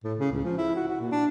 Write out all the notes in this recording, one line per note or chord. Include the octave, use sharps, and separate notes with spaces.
A2
C#3
C#2
F3
E4
F#4
F#4
A#2
D4